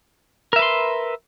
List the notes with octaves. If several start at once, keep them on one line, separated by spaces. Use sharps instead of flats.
A#4 B4 E5 C6